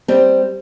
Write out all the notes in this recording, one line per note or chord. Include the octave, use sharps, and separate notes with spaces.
G3 C4